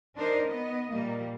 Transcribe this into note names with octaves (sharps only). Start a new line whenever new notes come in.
D4 D#4 A#4 C5
B3 D#5
A#2 G3 A#3